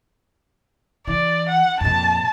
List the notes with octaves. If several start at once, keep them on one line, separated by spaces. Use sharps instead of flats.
E3 D5
F#5
F2 A#2 A5